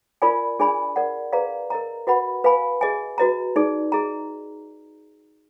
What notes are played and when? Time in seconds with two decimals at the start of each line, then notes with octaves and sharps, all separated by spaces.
0.22 F4 A#4 D5 G#5 B5
0.59 D4 G#4 D5 G#5 B5
0.96 A#4 D5 F#5
1.33 G#4 B4 D5 F5 A#5
1.70 A#4 D#5 A#5
2.07 F#4 B4 D#5 F#5 B5
2.44 B4 F5 G#5 B5
2.81 G#4 D#5 G#5
3.18 F#4 B4 D#5 A#5
3.56 D#4 G#4 D5
3.92 G#4 D#5 A#5